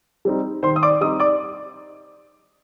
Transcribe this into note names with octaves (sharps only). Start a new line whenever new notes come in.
G3 C4 D#4
D#3 C5 C6
D#6
D5 D6
G3 C4 D#4 D#5 D#6
D5 D6